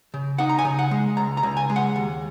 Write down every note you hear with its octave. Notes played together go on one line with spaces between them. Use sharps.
C#3
D#4 F#5
A#5
G#5
C#3
F#5
G#3
C#2 A#5
A#5
C#2
G#5
G#3
F#5
D#2